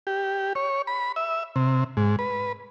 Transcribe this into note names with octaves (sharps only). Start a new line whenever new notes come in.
G4
C#5
B5
E5
C3
G#2
B4